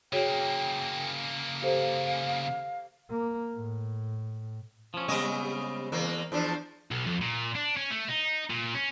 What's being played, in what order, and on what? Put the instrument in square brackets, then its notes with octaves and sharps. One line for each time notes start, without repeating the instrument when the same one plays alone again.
[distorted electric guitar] C#3 A#3 [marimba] F#4 G#4 C#5 [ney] G5
[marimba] G4 A4 C5 [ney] F5
[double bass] A#3
A2
[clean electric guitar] F3 C#4
[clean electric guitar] C#3 G#3 B3 [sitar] G3 C4 D#5
[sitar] E2 A#3
E2 F3 D4
[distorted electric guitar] B1
F2
A#2
D4
C#4
A3
D#4
A#2
C#4